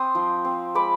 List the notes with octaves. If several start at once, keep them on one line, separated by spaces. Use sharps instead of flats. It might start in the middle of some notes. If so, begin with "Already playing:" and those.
Already playing: C4 G5 C6 D#6
F3
C4
G#3 B5 D6